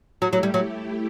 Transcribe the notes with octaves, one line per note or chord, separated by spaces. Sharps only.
F#3 A3 E4 G4
F#3
G3
F#3